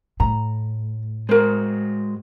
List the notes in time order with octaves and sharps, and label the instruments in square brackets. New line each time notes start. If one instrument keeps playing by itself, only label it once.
[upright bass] A2 [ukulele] A#5
[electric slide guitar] G#3 F#4 [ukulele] A#4 C5